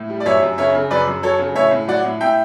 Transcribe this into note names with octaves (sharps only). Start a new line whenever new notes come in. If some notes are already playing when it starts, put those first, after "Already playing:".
Already playing: A2
G3
D5
F#2 C#5 E5
F#2
C#3 C#5 E5
C#3
F#2 B4 D5
F#2
F#3 A4 C#5
C#3
A2 C#5 E5
A2
F#3 D5 F#5
A2
A2 E5 G5